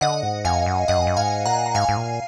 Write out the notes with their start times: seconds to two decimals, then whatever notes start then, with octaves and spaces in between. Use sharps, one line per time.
0.01 D3 D#5 F#5
0.23 G#2
0.45 F2 F5 G#5
0.66 F#2
0.88 F#2 D#5 F#5
0.97 F2
1.07 F#2
1.17 G#2 F5 G#5
1.46 A#2 F#5 A#5
1.66 A#5
1.75 G#2 F5 G#5
1.89 G#2
1.97 A#2